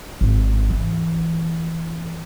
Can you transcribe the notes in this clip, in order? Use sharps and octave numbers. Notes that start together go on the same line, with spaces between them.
G#1
E3